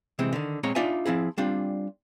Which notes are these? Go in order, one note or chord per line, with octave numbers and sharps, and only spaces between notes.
C3 E3 G#3 C4
D3 D#3
A#2 G#3 C4 C#5 A#5
D4 D#4 F4 D5 E5 G#5
F3 C4 E4 G#4
G3 C4 D4 F4